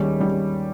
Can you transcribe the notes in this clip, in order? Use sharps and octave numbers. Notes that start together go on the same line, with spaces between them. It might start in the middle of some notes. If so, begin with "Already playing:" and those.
Already playing: D#2 D#3 G3 G#3 C#4
G3